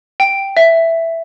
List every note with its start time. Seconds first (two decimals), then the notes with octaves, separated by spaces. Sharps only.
0.20 G5
0.57 E5